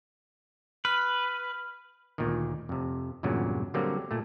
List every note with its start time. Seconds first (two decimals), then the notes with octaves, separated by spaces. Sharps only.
0.85 B4 F6
2.18 D2 A#2 D#3
2.69 F2 C3
3.23 E2 G2 A#2 C#3 F#3
3.74 D3 F#3 G3 A#3 C4
4.11 A#2 A3